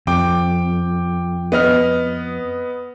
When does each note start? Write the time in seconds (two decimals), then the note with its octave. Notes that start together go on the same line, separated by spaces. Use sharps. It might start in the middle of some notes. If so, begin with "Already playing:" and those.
0.07 F2 G5 D6
1.52 B3 D#5 F6